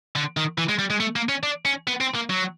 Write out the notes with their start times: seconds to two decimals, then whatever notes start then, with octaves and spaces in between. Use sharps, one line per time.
0.16 D3
0.37 D#3
0.58 E3
0.69 G#3
0.79 G3
0.90 G#3
1.00 A3
1.16 A#3
1.29 C#4
1.43 D4
1.65 C#4
1.87 B3
2.00 C4
2.15 A#3
2.30 F#3